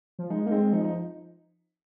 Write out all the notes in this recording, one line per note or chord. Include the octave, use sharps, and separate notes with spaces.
F3
G#3 D#4
A#3 D#4
G#3 C4
F3 D#4
D#4